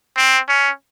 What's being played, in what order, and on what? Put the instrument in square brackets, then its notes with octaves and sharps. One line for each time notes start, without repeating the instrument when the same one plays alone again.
[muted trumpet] C4
C#4